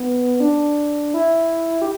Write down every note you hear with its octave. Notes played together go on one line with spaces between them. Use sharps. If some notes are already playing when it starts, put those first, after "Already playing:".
Already playing: B3
D4
E4
G4